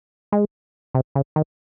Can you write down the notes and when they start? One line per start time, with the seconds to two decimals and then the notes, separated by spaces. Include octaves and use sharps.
0.32 G#3
0.95 C3
1.15 C#3
1.36 D#3